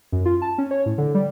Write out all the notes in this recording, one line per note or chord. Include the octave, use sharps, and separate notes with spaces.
F#2
F4
A5
C#4
C#5
A2
D3
G3